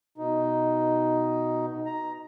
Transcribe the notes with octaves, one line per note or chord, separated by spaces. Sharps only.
B2 D#4
A#5